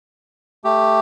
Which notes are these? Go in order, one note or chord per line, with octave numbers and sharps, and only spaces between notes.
A3 G4